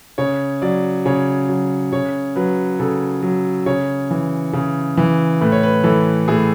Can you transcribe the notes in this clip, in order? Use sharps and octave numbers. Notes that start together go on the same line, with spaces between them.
C#3 C#5
F#3 D5
C#3 C#5
F#3
C#3 C#5
F#3 B4
C#3 A4
F#3
C#3 C#5
E3
C#3
E3
A2 B4
C#5
B4
E3 A4
A2 G#4